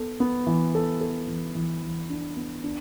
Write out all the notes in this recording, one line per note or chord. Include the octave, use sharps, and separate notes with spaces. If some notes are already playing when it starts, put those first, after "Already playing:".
Already playing: B3 A4
B3
E3
A4
A4
E3
E3
E3
D4
B3
D4